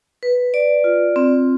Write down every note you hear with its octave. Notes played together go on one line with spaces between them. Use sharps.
B4
D5
F4
C4